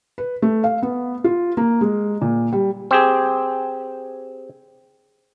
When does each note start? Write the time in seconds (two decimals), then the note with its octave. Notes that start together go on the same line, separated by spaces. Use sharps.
0.18 B4
0.42 A3
0.64 F5
0.82 B3
1.24 F4
1.57 A#3
1.81 G#3
2.21 A#2
2.53 G3
2.91 C4 G4 G#4